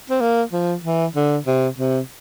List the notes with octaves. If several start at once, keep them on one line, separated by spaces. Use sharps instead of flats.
C4
A#3
F3
E3
D3
C3
C3